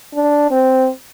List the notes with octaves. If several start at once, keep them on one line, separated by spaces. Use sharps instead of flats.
D4
C4